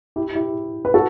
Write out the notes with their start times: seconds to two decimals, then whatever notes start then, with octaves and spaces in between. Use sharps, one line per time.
0.16 E4 G4
0.35 E4 G4
0.85 B4
0.94 F#4 A4